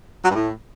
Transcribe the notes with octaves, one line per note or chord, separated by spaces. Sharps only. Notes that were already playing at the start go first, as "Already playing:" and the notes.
F#3
G2
A2